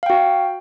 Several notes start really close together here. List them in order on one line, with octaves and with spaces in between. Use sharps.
F5 G5 F#4